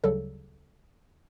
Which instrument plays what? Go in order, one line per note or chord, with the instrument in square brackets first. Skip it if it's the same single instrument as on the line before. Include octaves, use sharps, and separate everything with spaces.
[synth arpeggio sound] D2 C#3 F#3 G3 A4